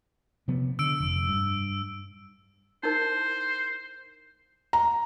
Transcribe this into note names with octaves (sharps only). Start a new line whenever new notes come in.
C3 F3 B3
D3 E6 D7
F1
G2
D#4 E4 A#4 C5
A#5